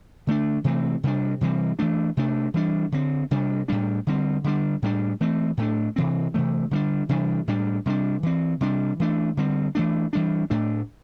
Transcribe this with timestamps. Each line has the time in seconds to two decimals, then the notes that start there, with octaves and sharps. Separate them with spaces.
0.27 D3 A3 D4
0.64 C3 E3 A3 C4
1.03 C3 G3 D4
1.41 C3 E3 G3 C4
1.79 E3 A3 D4
2.17 C3 A3 D4
2.54 E3 G3 D4
2.92 D3 C4
3.31 C3 G3 D4
3.68 A2 G3 D4
4.07 D3 G3 C4
4.44 D3 G3 D4
4.82 A2 G3 D4
5.20 E3 A3 C4
5.57 A2 A3 D4
5.96 C3 E3 C4
6.34 C3 E3 A3
6.71 D3 G3 D4
7.09 C3 E3 G3 D4
7.47 A2 G3 D4
7.86 C3 G3 D4
8.23 E3 C4
8.61 C3 G3 D4
9.00 E3 A3 D4
9.37 D3 G3 C4
9.75 E3 A3 D4
10.13 E3 G3 D4
10.50 A2 A3 D4